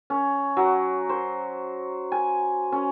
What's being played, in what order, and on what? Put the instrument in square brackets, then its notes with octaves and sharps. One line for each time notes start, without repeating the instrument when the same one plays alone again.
[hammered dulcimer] C#4
F#3
C5
G#5
C#4